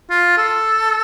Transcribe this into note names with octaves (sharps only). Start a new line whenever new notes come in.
F4
A4